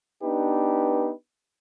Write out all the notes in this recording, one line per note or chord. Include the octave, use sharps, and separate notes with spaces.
B3 D4 D#4 G4 B4